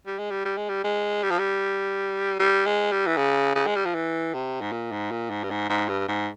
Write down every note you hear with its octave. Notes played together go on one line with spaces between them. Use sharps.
G3
G#3
G3
G3
G#3
G3
G#3
G3
F3
G3
G3
G#3
G3
E3
C#3
C#3
G#3
G3
F3
E3
C3
G#2
A#2
G#2
A#2
G#2
G2
G#2
G#2
G2
G#2